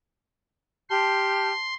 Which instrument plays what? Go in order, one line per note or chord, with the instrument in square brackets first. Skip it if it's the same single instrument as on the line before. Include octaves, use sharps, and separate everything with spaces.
[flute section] G4 F6 G6 [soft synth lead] A5 [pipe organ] C6